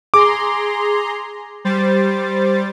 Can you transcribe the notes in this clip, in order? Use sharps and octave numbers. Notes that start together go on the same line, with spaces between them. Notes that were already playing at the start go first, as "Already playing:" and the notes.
G#4 A#5 C6 D6
G3 C5 A6